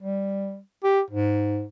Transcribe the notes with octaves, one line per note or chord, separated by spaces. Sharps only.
G3
G4
G#2